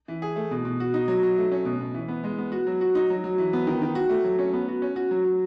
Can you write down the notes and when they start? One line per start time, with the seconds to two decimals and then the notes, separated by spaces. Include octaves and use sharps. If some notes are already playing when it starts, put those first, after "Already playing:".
0.08 E3
0.22 G#4
0.36 A3
0.51 B2
0.65 B2
0.80 F#4
0.94 D#4
1.08 F#3
1.23 F#3
1.38 A3
1.52 C#4
1.65 B2
1.80 B2
1.94 E3
2.08 B3
2.24 G#3
2.38 B3
2.52 F#4
2.67 F#3
2.81 F#4
2.95 D#4
3.10 F#3
3.24 F#3
3.38 E3
3.53 B3
3.67 D#3
3.82 D#3
3.95 F#4
4.09 A3
4.24 F#3
4.39 C#4
4.53 B3
4.68 F#4
4.82 C#4
4.96 F#4
5.11 F#3
5.25 F#3